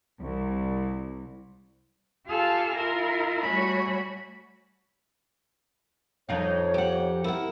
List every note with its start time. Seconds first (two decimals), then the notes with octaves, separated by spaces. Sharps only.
0.20 C2
2.27 F4 G4 A4 F5 G#5 F6
2.73 E4 F4 A#4
3.42 G3 A3 F#4 C#5 G#5 B5
6.29 F2 D#4 C#5 F5
6.74 G4 F#5
7.24 E4 A#4 F#5